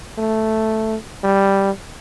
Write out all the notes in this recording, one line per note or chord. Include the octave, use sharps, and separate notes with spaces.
A3
G3